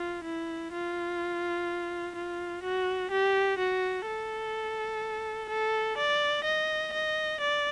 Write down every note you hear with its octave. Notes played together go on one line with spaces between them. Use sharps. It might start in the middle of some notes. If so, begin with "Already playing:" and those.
Already playing: F4
E4
F4
F4
F#4
G4
F#4
A4
A4
D5
D#5
D#5
D5